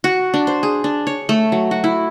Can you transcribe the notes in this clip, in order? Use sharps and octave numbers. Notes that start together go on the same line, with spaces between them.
F#4
D4
C5
G#4
D4
C#5
A3
F#3
F#4
E4